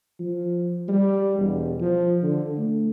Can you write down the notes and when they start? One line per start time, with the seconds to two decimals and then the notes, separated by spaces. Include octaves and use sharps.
0.20 F3
0.88 G3
1.39 E1
1.81 F3
2.23 D3
2.57 A3